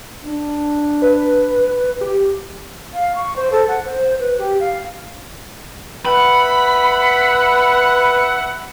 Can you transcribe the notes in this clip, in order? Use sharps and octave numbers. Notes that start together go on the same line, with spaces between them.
D4
B4
G4
F5
C#6
C5
A4
F#5
C5
B4
G4
F5
B4 E5 F#5 B5